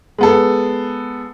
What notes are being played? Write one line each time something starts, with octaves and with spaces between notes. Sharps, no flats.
G#3 B3 A4